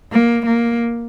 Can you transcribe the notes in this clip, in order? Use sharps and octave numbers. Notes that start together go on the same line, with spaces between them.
A#3
A#3